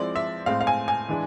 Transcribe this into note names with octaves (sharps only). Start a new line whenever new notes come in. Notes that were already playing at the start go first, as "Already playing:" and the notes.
Already playing: F3 G#3 C4 E4 D5
E5
A2 G#3 C4 F5
F5
G#5
G#5
E3 G#3 D4